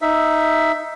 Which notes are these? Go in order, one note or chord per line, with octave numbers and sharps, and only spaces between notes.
D#4 E5